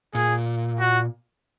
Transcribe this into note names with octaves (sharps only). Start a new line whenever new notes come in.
A#2 G#4
F#4